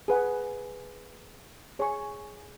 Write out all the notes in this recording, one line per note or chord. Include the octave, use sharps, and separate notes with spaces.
G#4 B4 F#5 B5
G#4 C#5 G#5 C#6